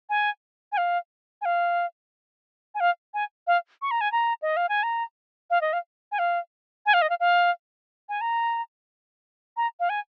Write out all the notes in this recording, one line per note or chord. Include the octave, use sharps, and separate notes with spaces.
G#5
G#5
F5
G#5
F5
G#5
F5
G#5
F5
C#6
A#5
G#5
A#5
D#5
F5
G#5
A#5
F5
D#5
F5
G#5
F5
G#5
F5
D#5
F5
F5
G#5
A#5
A#5
F5
G#5